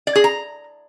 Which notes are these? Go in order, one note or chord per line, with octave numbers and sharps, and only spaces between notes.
D5
G#4
A#5